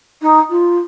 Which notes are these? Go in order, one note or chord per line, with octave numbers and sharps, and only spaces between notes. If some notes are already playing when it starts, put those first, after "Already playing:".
D#4
F4